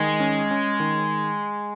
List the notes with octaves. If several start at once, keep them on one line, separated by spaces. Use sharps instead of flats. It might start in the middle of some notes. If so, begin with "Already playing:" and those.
Already playing: D#3 G#3
C#4
C#4
D#3